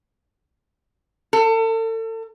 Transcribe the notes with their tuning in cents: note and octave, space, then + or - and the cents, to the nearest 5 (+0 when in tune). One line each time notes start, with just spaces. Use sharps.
A4 +35